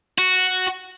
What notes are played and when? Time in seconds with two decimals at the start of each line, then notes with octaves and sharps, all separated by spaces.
0.18 F#4